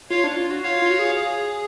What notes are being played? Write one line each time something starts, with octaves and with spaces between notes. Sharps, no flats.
F4 C#5 F5
D4
F4
F#4
F4 C#5 F5
F4
F#4
G#4
G#4